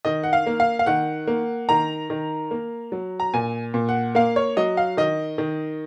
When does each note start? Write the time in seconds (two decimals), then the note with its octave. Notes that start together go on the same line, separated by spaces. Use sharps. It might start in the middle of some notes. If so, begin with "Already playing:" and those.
0.05 D#3 D#5
0.23 F#5
0.33 F5
0.46 A#3
0.60 F5
0.79 F5
0.86 D#3 F#5
1.27 A#3
1.69 D#3 A#5
2.10 D#3
2.51 A#3
2.92 F#3
3.20 A#5
3.34 A#2 G#5
3.74 A#2
3.89 F#5
4.15 A#3 F5
4.36 C#5
4.57 F#3 D#5
4.77 F5
4.97 D#3 D#5
5.38 D#3